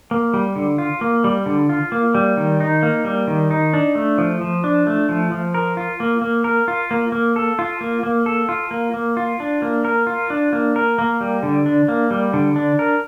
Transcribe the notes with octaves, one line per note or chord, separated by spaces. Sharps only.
A#3
G3
D3
F4
A#3
G3
D3
F4
A#3
G3
D#3
D#4
A#3
G3
D#3
D#4
D4
A3
F3
F3
D4
A3
F3
F3
A#4
F4
A#3
A#3
A#4
F4
A#3
A#3
A4
F4
A#3
A#3
A4
F4
A#3
A#3
F4
D4
A#3
A#4
F4
D4
A#3
A#4
A#3
G3
D3
D4
A#3
G3
D3
D4
A#4